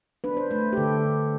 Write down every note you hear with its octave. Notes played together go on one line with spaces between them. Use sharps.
D4 B4
C5
A3 B4
G4
D3 A4
D3